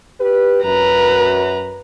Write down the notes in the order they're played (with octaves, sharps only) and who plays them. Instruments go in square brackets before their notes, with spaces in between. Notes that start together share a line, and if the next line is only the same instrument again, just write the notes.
[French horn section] G4 B4
[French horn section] F#2 [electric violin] B4 A#5